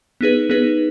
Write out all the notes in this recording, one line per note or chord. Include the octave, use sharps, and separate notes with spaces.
B3 D#4 G#4 B4
B3 D#4 G#4 B4